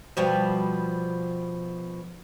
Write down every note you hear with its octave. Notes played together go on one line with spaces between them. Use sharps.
B2 F3 G3